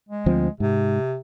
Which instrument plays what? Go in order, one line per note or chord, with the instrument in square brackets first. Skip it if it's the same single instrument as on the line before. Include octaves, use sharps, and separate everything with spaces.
[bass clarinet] G#3
[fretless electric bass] D2 F3 C4
[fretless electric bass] G#2 [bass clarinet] C3